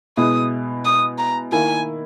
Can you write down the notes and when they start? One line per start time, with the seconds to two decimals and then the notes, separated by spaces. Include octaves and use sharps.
0.17 B2 G#3 B3 E4 D#6
0.85 D#6
1.18 A#5
1.52 D#3 A#3 E4 G#5